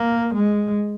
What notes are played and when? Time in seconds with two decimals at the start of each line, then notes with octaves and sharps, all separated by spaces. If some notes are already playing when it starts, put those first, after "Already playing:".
Already playing: A#3
0.34 G#3